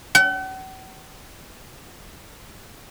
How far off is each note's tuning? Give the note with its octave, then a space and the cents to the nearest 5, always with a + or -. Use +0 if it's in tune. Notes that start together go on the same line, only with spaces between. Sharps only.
F#5 +45